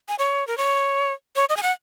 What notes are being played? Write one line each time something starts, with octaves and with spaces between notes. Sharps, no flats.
G#5
C#5
A#4
C#5
C#5
D#5
G#5
F#5